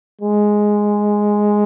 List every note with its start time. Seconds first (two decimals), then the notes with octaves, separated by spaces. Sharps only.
0.21 G#3